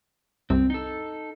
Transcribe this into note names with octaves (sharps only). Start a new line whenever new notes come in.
C2 F#2 C3 C4
D#4 A4